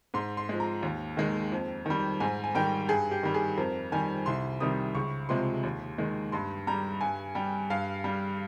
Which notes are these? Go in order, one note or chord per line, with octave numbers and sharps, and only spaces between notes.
G#2 C6
C6
F3 G#3
A#5
D#2
D#3 G#3
F2
D#3 G3
G#2 G#5
G#5
D#3 G3 G5
G2 G#4
G4
D#3 G3
G#4
F2 A#4
D#3 G3 G#5
C2 C6
C3 D#3 G3 D#6
C#2 C#6
C3 F3 G#3 C6
D#2
D#3 G#3
G2 C6
G3 A#5
G2 G#5
G3 G5
G2 F5
G3